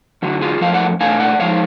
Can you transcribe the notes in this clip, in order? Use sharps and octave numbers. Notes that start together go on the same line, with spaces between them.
F#2 D3 F#3
F4 G#4
F#2 F3 A3 F5
D5 F#5
B2 A3 D4 F5 G#5
D5 F#5
F2 F3 G#3 C#5 F5